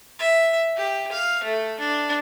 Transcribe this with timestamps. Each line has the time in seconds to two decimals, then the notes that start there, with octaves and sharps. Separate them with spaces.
0.19 E5
0.77 G4
1.12 F5
1.44 A3
1.80 D4